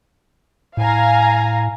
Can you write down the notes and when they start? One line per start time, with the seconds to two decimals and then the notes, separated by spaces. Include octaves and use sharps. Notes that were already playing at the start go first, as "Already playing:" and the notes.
0.77 A2 F5 G#5 A#5